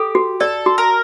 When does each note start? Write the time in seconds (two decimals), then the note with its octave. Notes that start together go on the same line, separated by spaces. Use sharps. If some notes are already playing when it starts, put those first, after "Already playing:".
Already playing: G4 A4
0.15 F#4
0.40 A4 D5
0.66 F#4
0.78 A#4